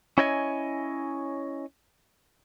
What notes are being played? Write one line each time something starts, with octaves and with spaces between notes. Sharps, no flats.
C#4 E4 C#5 D#5 G5 G#5